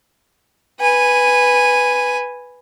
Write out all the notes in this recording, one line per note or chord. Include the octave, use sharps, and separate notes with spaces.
B4 G#5